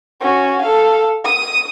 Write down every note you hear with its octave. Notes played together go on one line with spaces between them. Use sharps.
C#4 F#4
A4 F5
D#6